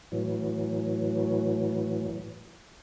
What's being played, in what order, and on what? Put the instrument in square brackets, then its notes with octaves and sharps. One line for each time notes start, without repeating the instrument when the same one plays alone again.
[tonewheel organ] A2 E3 F#3